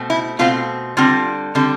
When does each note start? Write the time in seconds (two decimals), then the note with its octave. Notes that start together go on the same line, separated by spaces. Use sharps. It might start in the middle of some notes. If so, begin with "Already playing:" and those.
Already playing: B2 A3 C4
0.10 E4
0.39 B2 A3 C4 F4
0.97 D3 G3 C4 F4
1.55 D3 G3 C4